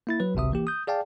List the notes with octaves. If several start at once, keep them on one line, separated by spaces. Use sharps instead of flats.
A#3 E4 A6
F#3 B4
G#1 C#2 C3 E5 D#6
E3 A#3 G4
D#6 G6
G#4 D5 F5 G5 A5